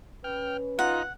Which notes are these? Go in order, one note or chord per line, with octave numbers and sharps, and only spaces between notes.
C#4 B4 G5 F6
D#4 F4 F#5 A#5